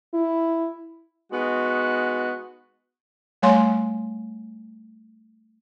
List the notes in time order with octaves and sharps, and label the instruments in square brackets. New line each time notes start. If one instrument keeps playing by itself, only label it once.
[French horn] E4
[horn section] G#3 B3 D#4 F#4
[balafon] G3 A3 C#5 F5 G#5 C6